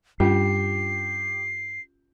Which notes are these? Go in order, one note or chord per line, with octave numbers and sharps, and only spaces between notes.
G2 C#4 F4 G4 C7